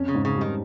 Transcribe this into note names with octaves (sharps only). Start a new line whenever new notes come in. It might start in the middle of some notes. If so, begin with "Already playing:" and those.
Already playing: F2 C#4
C#3
G#2
C#3
G3
D#3